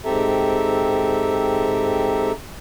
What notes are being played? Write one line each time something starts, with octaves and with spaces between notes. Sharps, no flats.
G#2 C4 G4 A4 E5 A#5